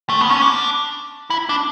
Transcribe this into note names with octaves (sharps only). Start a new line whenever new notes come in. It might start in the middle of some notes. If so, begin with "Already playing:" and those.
A3
B3
C#4
D4
E4
D4